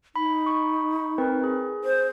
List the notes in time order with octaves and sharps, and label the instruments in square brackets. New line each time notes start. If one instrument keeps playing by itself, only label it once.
[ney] D#4 [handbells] B5
[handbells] B5 C#6
C4 A#4 B4
G#4
[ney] C5